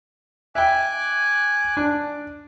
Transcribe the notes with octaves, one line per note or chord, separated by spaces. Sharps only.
E5 G5 G#5 D6 F#6
D4